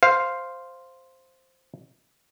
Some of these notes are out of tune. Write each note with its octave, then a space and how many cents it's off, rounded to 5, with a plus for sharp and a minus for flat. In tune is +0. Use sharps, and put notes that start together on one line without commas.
C5 +0 F5 +0